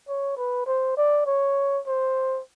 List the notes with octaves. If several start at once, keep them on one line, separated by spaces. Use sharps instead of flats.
C#5
B4
C5
D5
C#5
C5